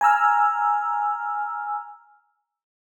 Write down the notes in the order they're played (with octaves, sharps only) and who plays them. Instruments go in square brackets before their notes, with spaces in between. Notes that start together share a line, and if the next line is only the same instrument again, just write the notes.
[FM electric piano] G#5 A#5 E6 F6